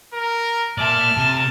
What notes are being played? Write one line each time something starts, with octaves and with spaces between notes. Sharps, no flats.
A#4
A#3 D5 E5 A5 F6
C3 A5